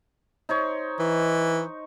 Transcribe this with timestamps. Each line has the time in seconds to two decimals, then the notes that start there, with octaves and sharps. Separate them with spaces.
0.49 D#4 C5 C#5
0.99 E3